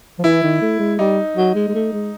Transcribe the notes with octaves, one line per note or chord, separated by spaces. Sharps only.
F3
E3 E4
D#3
A3
G#3
G3 D#4
F#3
G#3
G#3
A3
G#3